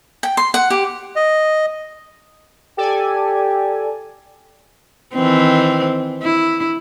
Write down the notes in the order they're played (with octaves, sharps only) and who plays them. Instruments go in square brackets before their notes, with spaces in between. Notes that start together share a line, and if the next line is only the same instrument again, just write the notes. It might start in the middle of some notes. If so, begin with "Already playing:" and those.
[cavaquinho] G5
C6
F#5
G4
[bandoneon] D#5
[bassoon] G4 [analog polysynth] A4 D5 G#5
[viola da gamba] D#3 E3 C4
E4